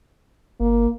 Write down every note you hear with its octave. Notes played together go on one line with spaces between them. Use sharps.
G1 A#3